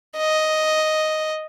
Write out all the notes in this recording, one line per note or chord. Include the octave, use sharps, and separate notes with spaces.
D#5